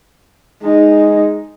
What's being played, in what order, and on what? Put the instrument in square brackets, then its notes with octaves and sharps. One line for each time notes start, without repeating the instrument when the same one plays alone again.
[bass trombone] G#3 [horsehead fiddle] D#4